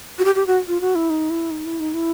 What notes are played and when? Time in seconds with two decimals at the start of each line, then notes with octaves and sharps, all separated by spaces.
0.19 F#4
0.25 G4
0.35 G4
0.47 F#4
0.68 F4
0.81 F#4
0.95 E4
1.10 D#4
1.30 E4
1.51 D#4
1.65 E4
1.80 D#4
1.94 E4